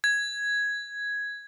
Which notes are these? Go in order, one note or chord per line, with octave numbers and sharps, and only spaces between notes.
G#6